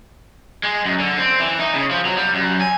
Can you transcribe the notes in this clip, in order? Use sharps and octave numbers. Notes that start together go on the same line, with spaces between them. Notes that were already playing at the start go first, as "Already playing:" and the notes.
G#3
F#2
D3
C4
E3
D#4
C#3
F3
F#3
G3
F#2
G#5